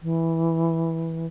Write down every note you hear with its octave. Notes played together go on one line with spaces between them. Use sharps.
E3